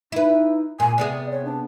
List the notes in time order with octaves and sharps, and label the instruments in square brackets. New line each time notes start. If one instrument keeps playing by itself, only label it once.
[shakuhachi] D#4 [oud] E4 B4
[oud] A#2 [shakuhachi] G#5
[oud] C3 B3 G#4 [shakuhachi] D5
[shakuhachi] C#5
D4